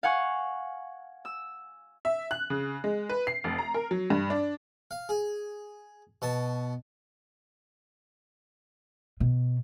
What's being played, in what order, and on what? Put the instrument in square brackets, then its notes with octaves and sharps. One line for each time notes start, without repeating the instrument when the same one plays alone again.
[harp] F5 F#5 G#5 C#6
E6
[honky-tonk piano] E5
F#6
C#3
G#3
B4
C7
F1
A#5
A#4
F#3
G2
D4
[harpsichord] F5
G#4
B2 A5 D#6
[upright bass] B2